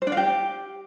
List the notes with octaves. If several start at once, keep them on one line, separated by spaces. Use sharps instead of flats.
C5
D4
F5
G4